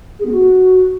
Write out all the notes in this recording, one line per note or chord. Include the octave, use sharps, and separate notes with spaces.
G#4
B3
F#4